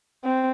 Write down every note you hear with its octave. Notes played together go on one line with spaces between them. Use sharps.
C4